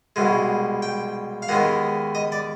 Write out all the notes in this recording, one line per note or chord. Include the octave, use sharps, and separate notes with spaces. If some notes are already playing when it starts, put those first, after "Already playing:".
C2 B2 G#3
G5
F5
D#2 D#3 G#3 B3 F#5
D#5
D5